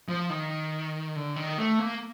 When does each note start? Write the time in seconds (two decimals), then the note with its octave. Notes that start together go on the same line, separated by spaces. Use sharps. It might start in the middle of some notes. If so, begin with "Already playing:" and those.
0.09 F3
0.30 D#3
1.16 D3
1.36 D#3
1.58 A3
1.79 A#3